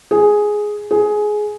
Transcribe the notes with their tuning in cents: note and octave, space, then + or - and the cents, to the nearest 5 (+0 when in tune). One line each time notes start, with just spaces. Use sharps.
G#4 +5
G#4 +15